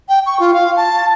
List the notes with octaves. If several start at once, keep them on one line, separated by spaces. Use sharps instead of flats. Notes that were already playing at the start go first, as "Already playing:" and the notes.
G5
C#6
F4
F5
A5